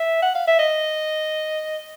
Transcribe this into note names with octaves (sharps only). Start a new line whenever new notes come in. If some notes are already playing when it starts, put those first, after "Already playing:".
Already playing: E5
F#5
F5
E5
D#5